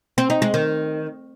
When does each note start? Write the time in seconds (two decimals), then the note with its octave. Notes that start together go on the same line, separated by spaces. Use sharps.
0.18 C4
0.30 D#4
0.42 G#3
0.54 D#3